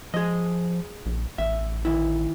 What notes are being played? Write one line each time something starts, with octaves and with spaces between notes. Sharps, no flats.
F3 G#4 D#5
A#1
A1 E5
D#3 E4